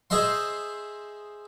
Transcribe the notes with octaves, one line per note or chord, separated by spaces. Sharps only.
G#4 C5 D#5 E5 C6